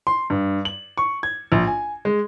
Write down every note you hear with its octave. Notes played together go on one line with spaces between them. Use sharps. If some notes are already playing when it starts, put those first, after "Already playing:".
C6
G2
F#7
C#6
G#6
A#1
G#5
G#3